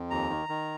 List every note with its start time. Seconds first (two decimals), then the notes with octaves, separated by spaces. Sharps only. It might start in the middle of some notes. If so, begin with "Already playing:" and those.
Already playing: F2
0.11 D#2 A#5
0.30 D#3
0.49 D#3